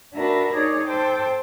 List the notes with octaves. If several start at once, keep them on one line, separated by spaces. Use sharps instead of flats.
D4 F#4 A#4 B4 E5 A#5
D#4 G#4 C#5 D5
A4 C5 G5 D6